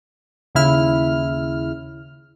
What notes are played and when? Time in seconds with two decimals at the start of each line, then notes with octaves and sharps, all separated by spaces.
0.55 D#2 C#3 E4 F6